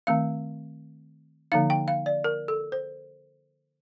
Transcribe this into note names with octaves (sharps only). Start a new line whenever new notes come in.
D#3 A3 C4 F5
D3 F3 A#3 D#4 F5
G5
F5
D5
A#4
A4
C5